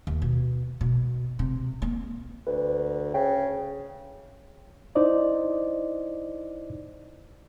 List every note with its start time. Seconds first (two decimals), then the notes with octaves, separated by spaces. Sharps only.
0.07 D#2
0.22 B2
0.81 B2
1.39 C3
1.82 A#3
2.47 D2 B4
3.14 C#3 G5
4.95 D#4 E4 C5 D5 D#5